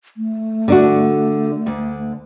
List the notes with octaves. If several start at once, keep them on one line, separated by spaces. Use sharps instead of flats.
A3
D3 D4 F#4
D2 D3